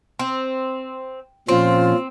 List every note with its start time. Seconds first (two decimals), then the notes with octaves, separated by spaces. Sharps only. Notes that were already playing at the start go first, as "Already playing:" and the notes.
0.19 C4
1.49 A#2 F3 C4 C#4 F4